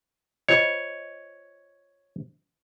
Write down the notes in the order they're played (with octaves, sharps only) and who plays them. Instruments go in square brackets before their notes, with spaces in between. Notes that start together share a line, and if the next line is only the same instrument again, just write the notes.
[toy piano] F4 C5 D#5 [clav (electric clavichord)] C#5